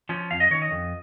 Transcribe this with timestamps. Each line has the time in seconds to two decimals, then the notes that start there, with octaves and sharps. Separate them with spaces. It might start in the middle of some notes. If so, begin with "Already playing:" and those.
0.09 F3 C#4
0.31 F2 F5
0.40 D#5
0.51 D#3 C#5
0.55 C#4
0.62 D#5
0.71 F2